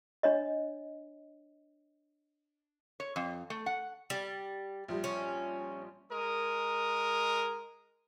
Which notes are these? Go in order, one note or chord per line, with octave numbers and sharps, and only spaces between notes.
D4 C#5 D#5
C#5
F2
A3
F#5
G3
A#1 F3 G3
C#4
G#3 A#4 D#6